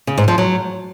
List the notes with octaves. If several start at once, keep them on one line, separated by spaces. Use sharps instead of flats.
C#3
G#2
F3
F#3